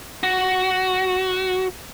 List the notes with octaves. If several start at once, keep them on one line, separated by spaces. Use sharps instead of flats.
F#4